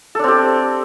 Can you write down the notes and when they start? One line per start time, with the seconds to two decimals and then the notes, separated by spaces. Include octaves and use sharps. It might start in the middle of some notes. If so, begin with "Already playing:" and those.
0.15 A4
0.19 D4
0.24 C4
0.28 G4